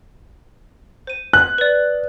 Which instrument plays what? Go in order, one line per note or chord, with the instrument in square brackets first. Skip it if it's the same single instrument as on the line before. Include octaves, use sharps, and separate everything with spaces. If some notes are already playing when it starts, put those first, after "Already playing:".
[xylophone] C5 D#7
[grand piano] F#6
[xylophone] B4 D5